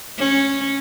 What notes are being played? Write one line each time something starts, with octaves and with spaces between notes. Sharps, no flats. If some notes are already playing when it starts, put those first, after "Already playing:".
C#4